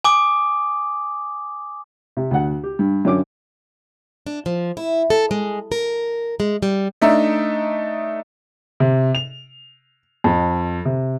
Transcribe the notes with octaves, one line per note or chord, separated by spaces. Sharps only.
G#5 D6 D#6
C3
D2 F#5
G4
G2
F#2 D3 C#4 D6
D4
F3
E4
A4
G#3
A#4
G#3
G3
A3 D4 D#4 E5
C3
F7
F2
C3